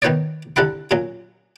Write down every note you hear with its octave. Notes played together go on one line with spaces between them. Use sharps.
D#3 B3 D#4 B4 C#5 D5
C2 D3 A4 F#5 B5
A#2 F#3 C#4